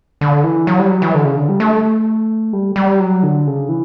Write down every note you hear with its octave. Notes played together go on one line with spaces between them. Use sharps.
D3
E3
F#3
G3
F#3
E3
D3
C#3
D3
G3
A3
G3
G3
F#3
D3
C#3
E3